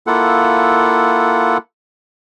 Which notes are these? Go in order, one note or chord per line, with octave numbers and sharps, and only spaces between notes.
A#3 E4 F4 A4 F#5